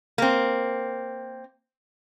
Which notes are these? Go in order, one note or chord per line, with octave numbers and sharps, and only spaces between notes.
A#3 C4